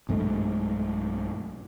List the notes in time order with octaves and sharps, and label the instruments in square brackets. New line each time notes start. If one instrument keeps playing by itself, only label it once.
[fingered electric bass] B1 G2 G#3 A3